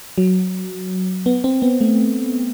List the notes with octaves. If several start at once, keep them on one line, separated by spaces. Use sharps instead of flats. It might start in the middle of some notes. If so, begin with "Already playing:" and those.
F#3
B3
C4
B3
A3